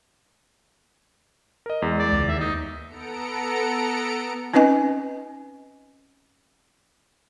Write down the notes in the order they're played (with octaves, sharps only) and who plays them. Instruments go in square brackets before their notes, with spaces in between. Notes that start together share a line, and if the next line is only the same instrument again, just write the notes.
[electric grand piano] A#4 D#5
[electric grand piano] E2 [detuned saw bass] G#3
[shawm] D5
[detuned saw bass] C#2
[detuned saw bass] D#2 [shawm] E5
[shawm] D#4
[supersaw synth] B3 A4 A#5 C#7 D7
[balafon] C4 C#4 D#4 B4 D#5 G#5